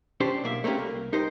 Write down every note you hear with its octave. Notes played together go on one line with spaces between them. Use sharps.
C#4 D4 G4 C5
B1 A#3 E5
A3 A#3 C4 C#4 G4
C2 A#3
D#4 G4 A#4 C5